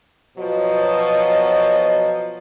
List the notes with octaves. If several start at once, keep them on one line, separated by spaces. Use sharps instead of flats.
B2 F3 F#3 B3 C#5 D#5